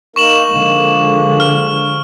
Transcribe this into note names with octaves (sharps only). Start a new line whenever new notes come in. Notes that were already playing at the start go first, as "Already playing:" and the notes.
A#3 D#4 A#4 C#6 E7 F#7
D3 F3 G#3 A#3
F6